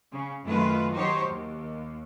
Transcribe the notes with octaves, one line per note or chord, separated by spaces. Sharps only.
C#3
F#2 D#3 A3 F4 B4
D#3 F#3 D#4 G4 C5 C#5
D#2